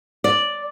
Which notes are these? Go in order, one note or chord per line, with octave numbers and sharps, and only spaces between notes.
D5